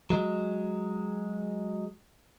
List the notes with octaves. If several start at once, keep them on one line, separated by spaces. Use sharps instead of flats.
F#3 G#3